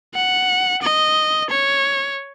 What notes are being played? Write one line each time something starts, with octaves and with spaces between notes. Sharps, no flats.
F#5
D#5
C#5